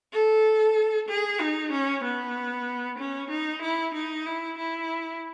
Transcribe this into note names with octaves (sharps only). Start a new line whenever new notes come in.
A4
G#4
D#4
C#4
B3
C#4
D#4
E4
D#4
E4
E4